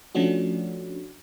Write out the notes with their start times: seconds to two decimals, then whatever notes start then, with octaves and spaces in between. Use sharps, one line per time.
0.15 F3 A3 C#4 D4 F#4